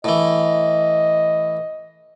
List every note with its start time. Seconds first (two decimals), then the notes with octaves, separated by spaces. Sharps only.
0.04 A2 E3 D#5